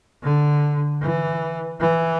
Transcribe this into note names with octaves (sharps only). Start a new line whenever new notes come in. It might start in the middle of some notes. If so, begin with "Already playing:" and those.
D3
E3
E3